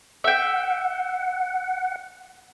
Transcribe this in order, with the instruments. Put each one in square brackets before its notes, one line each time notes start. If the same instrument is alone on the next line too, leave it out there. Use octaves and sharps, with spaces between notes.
[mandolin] E5 G5 [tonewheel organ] F#5